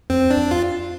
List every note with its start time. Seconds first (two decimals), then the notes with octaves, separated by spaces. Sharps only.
0.10 F2 C4
0.31 D4
0.37 F2
0.51 F4